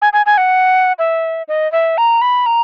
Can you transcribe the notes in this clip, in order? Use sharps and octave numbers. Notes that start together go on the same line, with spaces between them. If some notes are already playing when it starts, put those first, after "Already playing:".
G#5
G#5
G#5
F#5
E5
D#5
E5
A#5
B5
A#5